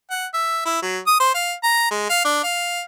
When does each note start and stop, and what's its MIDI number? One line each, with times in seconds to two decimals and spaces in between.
0.11 0.26 78
0.34 0.63 76
0.65 0.80 64
0.82 0.99 54
1.07 1.16 87
1.20 1.33 72
1.35 1.53 77
1.64 1.87 82
1.91 2.05 56
2.10 2.23 77
2.25 2.41 62
2.44 2.82 77